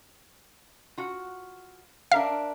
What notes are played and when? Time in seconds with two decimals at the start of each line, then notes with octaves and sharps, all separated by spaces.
0.97 F4 F#4
2.12 D4 A#4 E5 F5